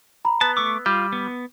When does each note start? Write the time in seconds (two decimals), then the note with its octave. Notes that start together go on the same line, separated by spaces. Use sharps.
0.25 A#5 B5
0.41 B3 A5
0.57 A3 C#6 D6 E6
0.86 G3 F4
1.13 B3